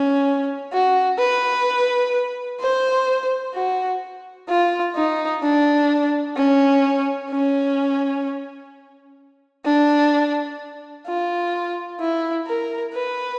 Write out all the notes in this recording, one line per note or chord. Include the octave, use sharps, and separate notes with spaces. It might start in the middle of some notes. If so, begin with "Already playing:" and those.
Already playing: C#4
F#4
B4
C5
F#4
F4
D#4
D4
C#4
C#4
D4
F4
E4
A#4
B4